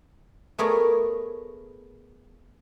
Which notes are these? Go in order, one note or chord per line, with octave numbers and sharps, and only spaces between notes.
A3 B3 G#4 A#4 C#5 D5